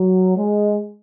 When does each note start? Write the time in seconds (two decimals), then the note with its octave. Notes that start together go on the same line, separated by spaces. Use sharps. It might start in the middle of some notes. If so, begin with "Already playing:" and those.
Already playing: F#3
0.37 G#3